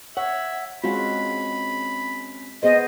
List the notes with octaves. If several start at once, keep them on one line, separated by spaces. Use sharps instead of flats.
C#5 E5 F#5
G#3 C4 C#4 F4 F#4 B5
B3 G#4 C5 D#5